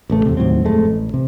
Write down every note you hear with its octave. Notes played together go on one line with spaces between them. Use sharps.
A1 C#3 A3
E2 C3
D#2 A2 F#3 C4
D1 F2 G#3 A3
A1
C3